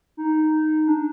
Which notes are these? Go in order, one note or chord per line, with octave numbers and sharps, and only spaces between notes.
D#4
D4